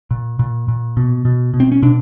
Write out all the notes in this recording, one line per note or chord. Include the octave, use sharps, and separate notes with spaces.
A#2
A#2
A#2
B2
B2
B2
C4
C#4
B2 D4